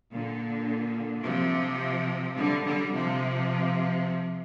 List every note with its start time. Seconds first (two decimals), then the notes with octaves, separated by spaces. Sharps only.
0.12 A#2 D3
1.25 C3 F3
2.37 D3 G3
2.66 D3 G3
2.94 C3 F3